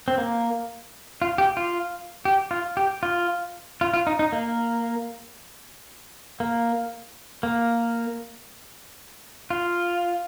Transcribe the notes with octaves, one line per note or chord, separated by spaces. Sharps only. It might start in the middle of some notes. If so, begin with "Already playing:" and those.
C4
A#3
F4
G4
F4
G4
F4
G4
F4
F4
F4
D#4
D#4
A#3
A#3
A#3
F4